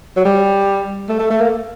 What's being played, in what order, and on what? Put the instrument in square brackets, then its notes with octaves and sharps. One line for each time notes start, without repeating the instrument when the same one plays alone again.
[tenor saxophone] F#3
G3
A3
A3
A3
A#3